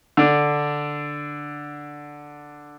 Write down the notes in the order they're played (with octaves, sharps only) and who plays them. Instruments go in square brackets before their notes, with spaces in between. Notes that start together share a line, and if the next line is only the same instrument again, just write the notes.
[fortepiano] D3 D4